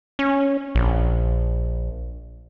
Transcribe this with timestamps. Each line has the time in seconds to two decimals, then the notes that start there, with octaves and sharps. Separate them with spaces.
0.19 C#4
0.75 A#1